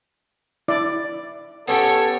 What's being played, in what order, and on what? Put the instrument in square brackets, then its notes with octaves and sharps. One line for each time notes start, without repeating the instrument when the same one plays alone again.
[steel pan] E4 D5
[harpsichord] B3 C#4 G4 [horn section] A4 C#5